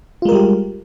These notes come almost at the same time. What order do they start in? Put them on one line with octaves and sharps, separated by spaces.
F4 G#3 A#4 G3 G4